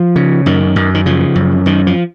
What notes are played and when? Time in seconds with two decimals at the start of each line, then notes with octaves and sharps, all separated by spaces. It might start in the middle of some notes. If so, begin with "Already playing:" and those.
Already playing: F3
0.16 C#3
0.46 F#2 D#3
0.76 F#2
0.94 D#3
1.06 C#3 F3
1.35 F#2
1.66 F#2 D#3
1.87 F3